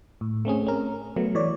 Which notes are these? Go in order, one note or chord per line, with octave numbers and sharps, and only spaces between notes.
A2
A3 C4 C#4 G#4
C#4 A#4
F#3 A3 B3
E3 C#5 D5